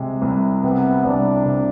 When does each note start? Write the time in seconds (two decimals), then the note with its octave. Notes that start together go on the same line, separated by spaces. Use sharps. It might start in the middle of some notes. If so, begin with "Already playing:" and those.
Already playing: C2 C3 G#3
0.22 C2
0.63 C3 B3
1.05 C2 D4
1.45 C3